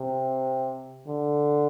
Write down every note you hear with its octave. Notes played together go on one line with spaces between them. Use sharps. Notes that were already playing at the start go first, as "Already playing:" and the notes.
Already playing: C3
D3